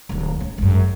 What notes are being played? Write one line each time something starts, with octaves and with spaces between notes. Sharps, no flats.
D1 D#2
C#4
G#1 F#2